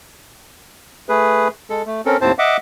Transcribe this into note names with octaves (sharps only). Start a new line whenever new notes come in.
A3 G#4 B4
G#3 A4
A3
C4 C#4 A4 A#4
D#2 A2 C4 C5 A5
D#5 E5 F#5 D6